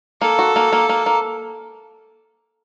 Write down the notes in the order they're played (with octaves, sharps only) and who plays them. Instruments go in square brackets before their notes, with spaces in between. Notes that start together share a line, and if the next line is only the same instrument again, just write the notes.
[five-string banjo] A#3 [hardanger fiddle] A4
[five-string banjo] F#4
A#3
A#3
A#3
A#3